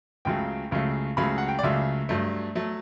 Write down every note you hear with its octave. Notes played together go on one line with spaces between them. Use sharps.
C#2 C#3 F#3 A3 G5
C#2 C#3 F#3 A3
C#2 C#3 F#3 A3 B5
F#5
G5
D5
C#2 C#3 F#3 A3 E5
G2 F#3 A3
F#3 A3